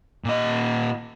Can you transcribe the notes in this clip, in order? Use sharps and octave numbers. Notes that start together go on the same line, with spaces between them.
A#2 D#5